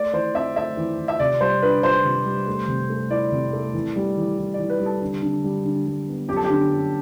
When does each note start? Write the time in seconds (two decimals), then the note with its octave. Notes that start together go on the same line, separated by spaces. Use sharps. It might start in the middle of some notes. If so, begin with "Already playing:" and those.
Already playing: A3 D5
0.13 E3 C5
0.34 C4 E5
0.56 A3 E5
0.77 E3
0.98 E3
1.08 E5
1.20 C3 D5
1.41 G3 C5
1.62 D4 B4
1.83 G3 C5
2.05 C3
2.25 G3
2.47 A3
2.68 C3
2.89 A3
3.10 E4 D5
3.32 C3
3.53 A3
3.74 E3
3.96 G3
4.17 E3
4.38 E3
4.54 E3 D5
4.70 B4
4.80 G3
4.86 A4
5.02 D3
5.22 D3
5.44 G3
5.65 D3
5.86 G3
6.08 B3
6.28 F#2 G4
6.36 A4
6.44 G4
6.50 D3
6.72 F#2